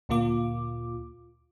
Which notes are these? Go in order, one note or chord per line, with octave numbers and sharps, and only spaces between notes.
D2 A#2 A#3 F4 D6